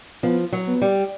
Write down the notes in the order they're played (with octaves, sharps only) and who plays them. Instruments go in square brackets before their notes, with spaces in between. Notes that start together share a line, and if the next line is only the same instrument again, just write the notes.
[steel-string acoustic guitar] F3 [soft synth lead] B3
[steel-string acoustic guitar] F#3
[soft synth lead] B3
[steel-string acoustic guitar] G3